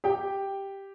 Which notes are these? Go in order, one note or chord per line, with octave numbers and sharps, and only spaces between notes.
G4 G5